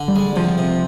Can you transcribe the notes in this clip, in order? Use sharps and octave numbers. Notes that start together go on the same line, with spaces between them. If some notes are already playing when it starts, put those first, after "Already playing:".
Already playing: D3
G3
G#3
C3 F3
C3